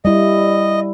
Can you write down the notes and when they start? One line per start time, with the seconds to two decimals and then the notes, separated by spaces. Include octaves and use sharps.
0.05 G3 E4 D#5